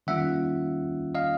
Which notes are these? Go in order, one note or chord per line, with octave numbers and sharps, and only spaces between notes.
D#3 G3 A#3 C#4 F4 E5 F#5
D#5 F5